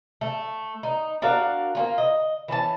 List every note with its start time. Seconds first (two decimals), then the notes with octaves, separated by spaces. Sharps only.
0.21 A3
0.83 D#4
1.22 D4 F#4 A#4 F5
1.75 A#3 C#4 F4
1.98 D#5
2.48 E3 C#4 D4 A5